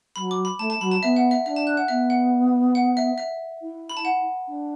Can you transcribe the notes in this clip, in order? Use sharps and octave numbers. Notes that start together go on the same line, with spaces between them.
F#3 B5
D6
B5
A3 A5
A5
F#3 B5
A5
B3 E5
F#5
E5
D4 E5
A5
F#6
F#5
B3 E5
F#5
F#5
E5
E5
E4
B5
A5
F#5
D4